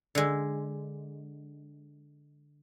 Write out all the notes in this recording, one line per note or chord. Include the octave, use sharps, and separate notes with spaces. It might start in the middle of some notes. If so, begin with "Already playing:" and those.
D3 G#3